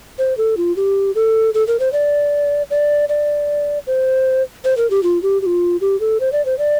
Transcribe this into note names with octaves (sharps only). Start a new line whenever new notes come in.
C5
A4
F4
G4
A4
A4
A#4
C5
D5
D5
D5
C5
C5
A#4
G4
F4
G4
G4
F4
G4
A4
C5
D5
C5
D5